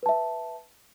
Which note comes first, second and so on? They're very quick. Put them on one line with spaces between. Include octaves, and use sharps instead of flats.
B4 A5 E5